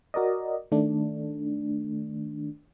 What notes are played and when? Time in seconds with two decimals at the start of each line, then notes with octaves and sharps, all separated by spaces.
0.14 F#4 A#4 D5 D#5
0.71 D#3 A3 D4